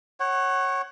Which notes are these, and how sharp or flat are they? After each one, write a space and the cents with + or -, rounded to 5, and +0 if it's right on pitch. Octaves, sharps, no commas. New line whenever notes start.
C#5 -20 F#5 +20